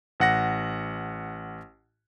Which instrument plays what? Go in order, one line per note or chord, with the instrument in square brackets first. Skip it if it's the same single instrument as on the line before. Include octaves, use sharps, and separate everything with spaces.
[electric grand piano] A1 F#5 A#6